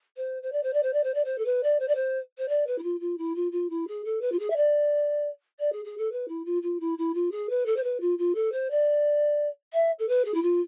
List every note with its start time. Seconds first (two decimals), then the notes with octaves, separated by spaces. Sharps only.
0.16 C5
0.42 C5
0.52 D5
0.63 C5
0.73 D5
0.83 C5
0.93 D5
1.03 C5
1.14 D5
1.25 C5
1.38 A4
1.45 B4
1.63 D5
1.79 C5
1.88 D5
1.95 C5
2.38 C5
2.48 D5
2.66 B4
2.78 E4
2.83 F4
3.00 F4
3.18 E4
3.35 F4
3.52 F4
3.69 E4
3.87 G#4
4.04 A4
4.21 B4
4.32 F4
4.39 G#4
4.50 E5
4.56 D5
5.59 D5
5.72 G#4
5.85 G#4
5.97 A4
6.12 B4
6.28 E4
6.45 F4
6.62 F4
6.80 E4
6.98 E4
7.14 F4
7.31 G#4
7.49 B4
7.66 A4
7.76 C5
7.83 B4
8.00 F4
8.18 F4
8.35 A4
8.52 C5
8.70 D5
9.73 E5
9.99 A4
10.08 B4
10.24 G#4
10.34 E4
10.42 F4